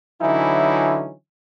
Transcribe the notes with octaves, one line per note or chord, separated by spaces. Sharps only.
D3 E3 F#3 C#4 D#4 E4